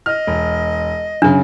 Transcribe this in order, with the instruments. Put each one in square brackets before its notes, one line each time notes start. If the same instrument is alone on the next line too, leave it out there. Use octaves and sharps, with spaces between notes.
[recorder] D#5 [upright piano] F6
[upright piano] E1
[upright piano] F#2 C#3 [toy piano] D4